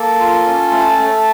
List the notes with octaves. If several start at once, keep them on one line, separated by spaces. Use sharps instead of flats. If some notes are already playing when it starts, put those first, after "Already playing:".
Already playing: A#3 A4
F4
C#4
A3
A3